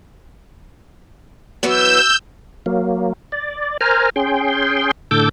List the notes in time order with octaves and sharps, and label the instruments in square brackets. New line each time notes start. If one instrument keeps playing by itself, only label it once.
[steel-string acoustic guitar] E3 F#3 B3 [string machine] E6 G6
[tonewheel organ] F#3 A#3
D5
A#4 C5 G#5 A#5 F6
C#4 G#4 G5 C6
A2 D3 A4 D6 E6 G6